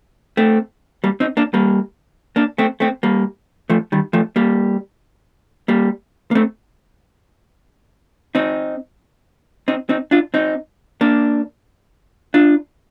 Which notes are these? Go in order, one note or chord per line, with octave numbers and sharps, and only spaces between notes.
A3 C4
G3 A#3
C4 D#4
A#3 D4
G3 A#3
A#3 D4
A3 C4
A3 C4
G3 A#3
F3 A3
D#3 G3
F3 A3
G3 A#3
G3 A#3
A#3
A3 C4
C4 D#4
C4 D#4
C4 D#4
D4 F4
C4 D#4
A#3 D4
D4 F4